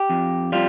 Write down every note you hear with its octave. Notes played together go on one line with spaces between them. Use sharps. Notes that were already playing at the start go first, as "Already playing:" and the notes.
Already playing: G4
F2
G3 F4